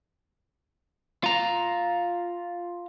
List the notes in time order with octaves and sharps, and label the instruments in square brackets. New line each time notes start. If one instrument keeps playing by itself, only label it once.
[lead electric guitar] F4 A#5